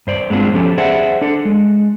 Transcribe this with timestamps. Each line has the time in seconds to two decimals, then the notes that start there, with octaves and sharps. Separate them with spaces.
0.07 G2 C5 D5
0.30 G#3 B3 C4 D4 F4
0.54 F3 C#4 G4 A4
0.78 G#4 C5 D5 E5 F#5
1.22 D4 A4
1.45 G#3